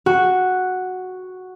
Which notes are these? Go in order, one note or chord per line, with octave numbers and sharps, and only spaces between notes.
F#4